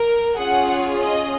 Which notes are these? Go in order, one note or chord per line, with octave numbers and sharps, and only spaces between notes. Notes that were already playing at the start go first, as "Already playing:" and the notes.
Already playing: A#4
C#4 F4 G#4 F#5
D#5